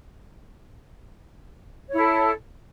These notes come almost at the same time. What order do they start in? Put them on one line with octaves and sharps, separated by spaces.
C#5 E4 A4